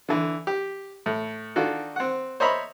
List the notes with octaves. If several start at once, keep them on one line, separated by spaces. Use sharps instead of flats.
D3 E3
G4
A2
D#3 D4 F4 F#4 A4
C4 F#5
C5 C#5 D#5 E5 A#5 B5